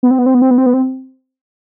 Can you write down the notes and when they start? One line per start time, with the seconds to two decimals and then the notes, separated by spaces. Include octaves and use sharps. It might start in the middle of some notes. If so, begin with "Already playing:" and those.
0.03 B3
0.11 C4
0.19 B3
0.26 C4
0.35 B3
0.42 C4
0.51 B3
0.58 C4
0.66 B3
0.74 C4